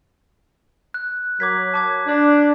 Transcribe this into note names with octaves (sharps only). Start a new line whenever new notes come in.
F#6
F#3 A#4 D6 G#6 B6
A5 D6 G#6
D4